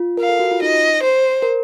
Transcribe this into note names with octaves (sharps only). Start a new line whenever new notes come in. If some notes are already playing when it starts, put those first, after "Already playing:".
Already playing: F4
A#4 F5
A4
F#4
F4
D#4 D#5
C5
A#4